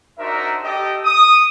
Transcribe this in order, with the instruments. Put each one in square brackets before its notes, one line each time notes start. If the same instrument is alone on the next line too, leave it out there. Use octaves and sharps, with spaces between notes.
[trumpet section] D4 D#4 F#4 A#4 C5 E5
G4 A4 D#5
D#6